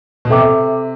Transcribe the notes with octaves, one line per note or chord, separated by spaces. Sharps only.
B2
C3 A4 E5 G5 D6